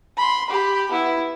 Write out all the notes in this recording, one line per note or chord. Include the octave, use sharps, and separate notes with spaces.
B5 C6
G4 B5
B3 E4